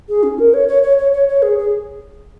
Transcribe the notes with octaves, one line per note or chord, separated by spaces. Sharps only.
G#4
C#4
A#4
C#5
C#5
C#5
C#5
C#5
C#5
G#4
G#4